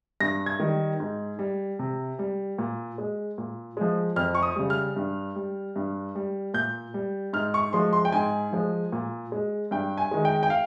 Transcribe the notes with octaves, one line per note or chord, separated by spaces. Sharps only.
G2 A#6
G#6
D#3 G3
G#2
G3
C3
G3
A#2
G#3
A#2
F3 G#3
F2 F6
C#6
D#6
C#3 G3
F6
G2
G3
G2
G3
A#2 G6
G3
G#2 F6
C#6
F3 G#3 C6
C6
G5
G#2 G#5
F3 G#3
A#2
G#3
G2 G5
G#5
D#3 G#3
G5
G5
F5